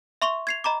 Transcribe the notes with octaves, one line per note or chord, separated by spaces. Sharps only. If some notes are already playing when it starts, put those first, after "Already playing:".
E5 C6 C#6 F7 G7
G#6 C7 F7
D#5 A#5 B5 D6